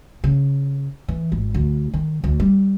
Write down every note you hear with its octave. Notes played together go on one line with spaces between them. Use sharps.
C#3
E3
G#1
D2
D#3
D2
G3